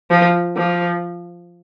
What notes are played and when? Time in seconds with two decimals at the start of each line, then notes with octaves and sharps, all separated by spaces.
0.10 F3
0.57 F3